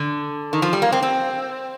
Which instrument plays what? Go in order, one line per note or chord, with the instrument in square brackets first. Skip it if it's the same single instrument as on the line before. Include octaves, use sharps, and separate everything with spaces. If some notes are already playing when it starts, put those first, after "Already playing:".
Already playing: [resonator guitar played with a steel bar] D3
D#3
F3
G3
A#3
C4
C4